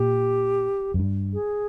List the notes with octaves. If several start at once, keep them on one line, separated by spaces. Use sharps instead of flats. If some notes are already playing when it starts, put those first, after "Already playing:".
Already playing: A#2 G4
F#2
G2
G#4